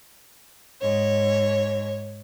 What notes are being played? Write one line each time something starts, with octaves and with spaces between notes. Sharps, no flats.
G#2 C#5